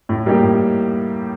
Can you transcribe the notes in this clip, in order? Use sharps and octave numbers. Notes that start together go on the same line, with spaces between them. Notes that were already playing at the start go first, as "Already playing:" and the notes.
A2
G3 A#3 D#4 G4
A2